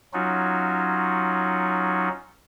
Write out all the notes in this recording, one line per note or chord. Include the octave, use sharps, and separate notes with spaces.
F#3 C#4 D#4 F4 F#4